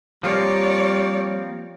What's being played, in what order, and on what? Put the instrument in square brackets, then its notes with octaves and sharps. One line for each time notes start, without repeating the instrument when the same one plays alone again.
[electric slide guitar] F3 A#3 C4 [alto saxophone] G3 [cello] C#5 D5